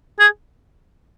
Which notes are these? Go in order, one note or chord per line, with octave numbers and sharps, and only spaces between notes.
G#4